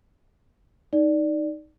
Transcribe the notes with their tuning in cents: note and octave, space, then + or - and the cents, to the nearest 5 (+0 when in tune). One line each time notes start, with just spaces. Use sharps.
D#4 +0 D5 +0